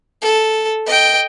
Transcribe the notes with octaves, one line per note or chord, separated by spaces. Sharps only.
A4
D#5 G5